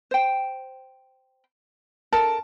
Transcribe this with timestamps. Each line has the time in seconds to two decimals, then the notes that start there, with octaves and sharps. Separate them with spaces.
0.11 C5 G5
2.13 A4 A#4 A5